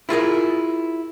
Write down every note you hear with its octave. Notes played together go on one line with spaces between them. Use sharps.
E4 F4 G#4 A#4